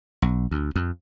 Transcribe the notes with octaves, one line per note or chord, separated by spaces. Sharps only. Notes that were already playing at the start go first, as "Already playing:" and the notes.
B1
D2
F2